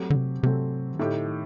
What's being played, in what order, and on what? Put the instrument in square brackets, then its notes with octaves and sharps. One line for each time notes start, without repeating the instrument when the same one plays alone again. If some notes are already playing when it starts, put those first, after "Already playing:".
Already playing: [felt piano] F#3 A3 C4 G4
[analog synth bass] D3
C3
[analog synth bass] C3 [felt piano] F#3 A3 C4 G4
[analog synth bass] D#3
[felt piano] A2 A3 D#4 G4 [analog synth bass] D3
[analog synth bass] D#3